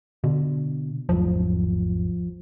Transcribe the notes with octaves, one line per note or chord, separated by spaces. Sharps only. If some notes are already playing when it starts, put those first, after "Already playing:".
B2 D3
G#1 E2 F3 F#3